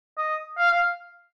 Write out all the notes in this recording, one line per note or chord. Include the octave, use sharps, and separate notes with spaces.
D#5
F5
F5